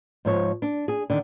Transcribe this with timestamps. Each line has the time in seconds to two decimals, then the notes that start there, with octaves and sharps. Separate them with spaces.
0.25 G#2 F3 C#5
0.62 D4
0.88 G#4
1.10 D3 D#3